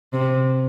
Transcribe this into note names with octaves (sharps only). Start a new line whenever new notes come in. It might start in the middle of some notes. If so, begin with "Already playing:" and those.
C3